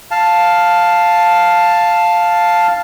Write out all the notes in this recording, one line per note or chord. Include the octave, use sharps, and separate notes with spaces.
F5 A5